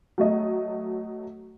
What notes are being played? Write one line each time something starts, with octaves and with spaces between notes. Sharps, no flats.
F#3 A3 D#5